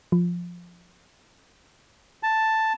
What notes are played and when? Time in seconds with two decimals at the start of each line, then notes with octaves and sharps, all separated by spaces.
0.12 F3
2.23 A5